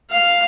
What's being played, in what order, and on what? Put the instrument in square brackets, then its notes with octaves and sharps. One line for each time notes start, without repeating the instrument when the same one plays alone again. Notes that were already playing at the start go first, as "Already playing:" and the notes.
[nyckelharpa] F5